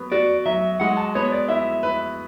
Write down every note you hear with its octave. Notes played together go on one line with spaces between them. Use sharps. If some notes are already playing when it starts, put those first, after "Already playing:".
Already playing: F#3 B3
F#4 D5
F#3 E5
G#3 F#5
A5
B3 C#5
D5
E4 E5
B4